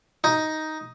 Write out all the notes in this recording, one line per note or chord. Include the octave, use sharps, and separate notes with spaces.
D#4